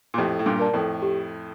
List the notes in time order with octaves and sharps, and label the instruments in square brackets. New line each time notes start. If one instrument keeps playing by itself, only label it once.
[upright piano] A#2
[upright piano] F2 A2 [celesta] G4
[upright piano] A2
G2 A#2
[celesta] A#4 D5 A5
[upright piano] F2 A2
[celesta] G4